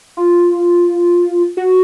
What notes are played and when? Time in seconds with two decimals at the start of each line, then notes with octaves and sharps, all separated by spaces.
0.17 F4
1.57 F#4